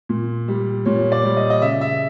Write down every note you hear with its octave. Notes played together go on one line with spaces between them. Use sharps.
A#2
G3
A#2 C#5
D5
G3
D#5
D#5
C#3 E5
E5